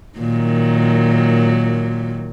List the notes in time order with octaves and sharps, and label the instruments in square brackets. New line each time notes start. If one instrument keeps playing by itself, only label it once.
[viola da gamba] A#2 D#3 F#3